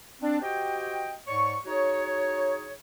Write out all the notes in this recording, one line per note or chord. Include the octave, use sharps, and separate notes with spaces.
C4 D4
F#4 G4 C5 D#5 G5
G#2 C#5 D5 C#6
D#4 F#4 G#4 C#5